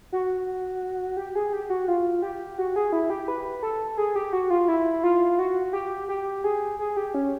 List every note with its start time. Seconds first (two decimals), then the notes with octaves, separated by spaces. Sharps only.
0.12 F#4
1.17 G4
1.35 G#4
1.53 G4
1.70 F#4
1.88 F4
2.22 G4
2.58 F#4
2.76 G#4
2.93 E4
3.10 G4
3.28 B4
3.63 A4
3.98 G#4
4.15 G4
4.33 F#4
4.50 F4
4.68 E4
5.03 F4
5.39 F#4
5.73 G4
6.08 G4
6.44 G#4
6.79 G#4
6.97 G4
7.14 C#4